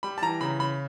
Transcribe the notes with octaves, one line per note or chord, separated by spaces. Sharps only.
G3 B5
A5
E3 A#5
C#3 B5
C#3 B5